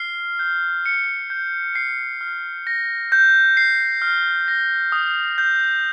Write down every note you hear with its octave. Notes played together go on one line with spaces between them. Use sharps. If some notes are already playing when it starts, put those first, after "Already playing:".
Already playing: F6 C7
G6
C#7
G6
C7
F6
A#6
G6
C7
F6
A#6
D#6
G6